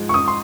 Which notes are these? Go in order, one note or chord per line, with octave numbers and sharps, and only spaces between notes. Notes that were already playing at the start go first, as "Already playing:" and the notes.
Already playing: G#2 F3 G#3
C#6
D#6
C6